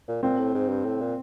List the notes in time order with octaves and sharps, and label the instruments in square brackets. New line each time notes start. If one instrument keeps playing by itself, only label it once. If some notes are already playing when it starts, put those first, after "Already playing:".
[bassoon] A#2
[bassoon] A#2 [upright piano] C4
[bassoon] A2
G#2
G2
A2
A#2